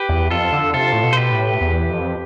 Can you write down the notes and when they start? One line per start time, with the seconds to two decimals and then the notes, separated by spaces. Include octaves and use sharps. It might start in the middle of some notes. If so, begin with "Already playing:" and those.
Already playing: G4 B4
0.09 E2
0.30 F2 F4 A4
0.52 D3
0.74 C3 F4 A4
0.93 A2
1.03 B2
1.13 C5
1.17 G4 B4
1.32 A2
1.61 E2
1.89 F2